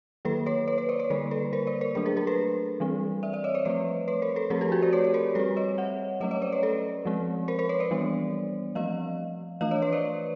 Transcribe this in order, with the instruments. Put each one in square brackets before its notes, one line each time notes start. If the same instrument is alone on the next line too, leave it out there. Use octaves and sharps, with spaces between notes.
[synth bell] D#3 F#3 A#3 A4 B4
B4 C#5
B4 C#5
B4 C#5
C5 D5
B4 C#5
D3 G3 A#3 A#4 C5
A4 B4
A#4 C5
C5 D5
A#4 C5
F#3 A3 D4 A#4 C5
G#4 A#4
G#4 A#4
A4 B4
E3 G3 C4
D5 E5
D5 E5
C#5 D#5
C5 D5
F3 A3 C4 B4 C#5
B4 C#5
A#4 C5
A4 B4
F3 A3 C4 G#4 A#4
G4 A4
F#4 G#4
C5 D5
B4 C#5
B4
A#4 C5
G3 A4 B4
C4
C#5 D#5
E5 F#5
F#3 A3 C#4 C#5 D#5
C#5 D#5
C5 D5
B4 C#5
A4 B4
F3 G#3 C4
A#4 C5
A#4 C5
B4 C#5
C5 D5
E3 G3 B3 D4
F3 A3 C4 D#5 F5
E3 A3 D4 D#5 F5
C#5 D#5
B4 C#5
C5 D5